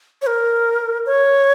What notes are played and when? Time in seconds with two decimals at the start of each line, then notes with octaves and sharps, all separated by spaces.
0.22 C#5
0.27 A#4
1.06 C#5